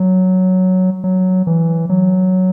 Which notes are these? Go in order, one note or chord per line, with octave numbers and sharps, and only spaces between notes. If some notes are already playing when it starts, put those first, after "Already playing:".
Already playing: F#3
F#3
E3
F#3